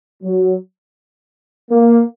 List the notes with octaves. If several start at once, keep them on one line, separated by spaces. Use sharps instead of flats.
F#3
A#3